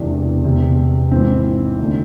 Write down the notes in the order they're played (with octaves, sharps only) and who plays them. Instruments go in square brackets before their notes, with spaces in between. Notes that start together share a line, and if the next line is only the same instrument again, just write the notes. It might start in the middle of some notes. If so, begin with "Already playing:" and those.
Already playing: [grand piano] E1 E2 C3 E3 D4
E1 E2 C3
G#1 G#2 E3 C4
D2 D3